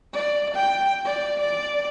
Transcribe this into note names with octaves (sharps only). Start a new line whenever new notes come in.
D5
G5
D5
D5